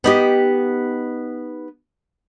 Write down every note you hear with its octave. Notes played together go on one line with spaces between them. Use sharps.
B3 D#4 G4